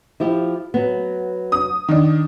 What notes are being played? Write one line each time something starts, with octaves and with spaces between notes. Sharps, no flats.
F3 E4 G4
F#3 B3
D#6
D#3 D4